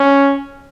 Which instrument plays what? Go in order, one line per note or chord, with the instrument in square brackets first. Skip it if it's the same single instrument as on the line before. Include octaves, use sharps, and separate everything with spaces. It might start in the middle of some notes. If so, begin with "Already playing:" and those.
Already playing: [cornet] C#4